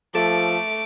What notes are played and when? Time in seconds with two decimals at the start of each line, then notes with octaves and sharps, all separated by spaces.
0.15 F3 A3 A4 D6